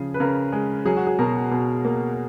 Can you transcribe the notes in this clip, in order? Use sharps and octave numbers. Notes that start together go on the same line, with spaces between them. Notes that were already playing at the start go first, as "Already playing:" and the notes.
Already playing: C#3 F3 G#4
B4
C#3 A#4
G#3
F#3 G#4
F#4
G#4
B2 A#4
B2
A#3